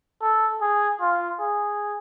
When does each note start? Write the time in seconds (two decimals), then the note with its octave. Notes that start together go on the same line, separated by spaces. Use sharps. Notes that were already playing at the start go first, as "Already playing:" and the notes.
0.22 A4
0.61 G#4
1.01 F4
1.40 G#4